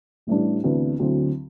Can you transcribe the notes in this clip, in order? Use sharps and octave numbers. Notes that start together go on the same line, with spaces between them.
A1 A2 E3 G3 D4
D2 C3 E3 B3 D4
D2 D3 F#3 C4 E4